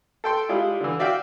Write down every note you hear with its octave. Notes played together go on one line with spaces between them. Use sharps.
A4 G5 C6
G3 G#3 E4 F4
D3 E3
F#4 D5 E5 F5 G5